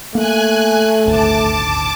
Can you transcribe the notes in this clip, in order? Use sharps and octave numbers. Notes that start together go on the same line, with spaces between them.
A3 A#3 G#5 F#6
D#1 G#1 D2 A5 D6